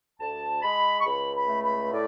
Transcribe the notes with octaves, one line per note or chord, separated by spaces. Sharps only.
D2 A5
G#3 B5
C#6
C#2 B5
B5
A3
B5
A2 D5